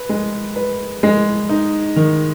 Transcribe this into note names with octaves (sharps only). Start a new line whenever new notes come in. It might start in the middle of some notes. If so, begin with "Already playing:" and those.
Already playing: B4
G#3
B4
G#3
D#4
D#3